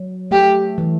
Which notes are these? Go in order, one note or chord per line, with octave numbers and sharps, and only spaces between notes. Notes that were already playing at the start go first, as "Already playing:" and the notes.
Already playing: F#3
A3 G4
E3